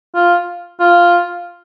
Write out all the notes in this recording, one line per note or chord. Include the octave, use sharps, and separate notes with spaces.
F4
F4